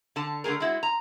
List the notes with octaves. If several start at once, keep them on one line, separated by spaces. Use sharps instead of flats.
D3 A5
D3 A3 B3 G#4 A#4
G#3 E4 F#4
A#5